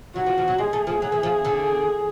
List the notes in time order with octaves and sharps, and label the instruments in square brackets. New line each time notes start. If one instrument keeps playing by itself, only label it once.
[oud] F#3 [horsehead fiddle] F#4
[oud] F3
F3
F#3
[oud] G#3 [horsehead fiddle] G#4
[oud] A3
F3
F#3
E3
F3
D3